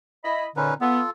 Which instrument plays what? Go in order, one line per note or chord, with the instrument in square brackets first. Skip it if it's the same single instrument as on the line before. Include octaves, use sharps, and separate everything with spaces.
[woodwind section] E4 D#5 B5
[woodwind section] A#2 D3 [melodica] C#4 D#4 B4
[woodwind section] B3 [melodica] F4 A4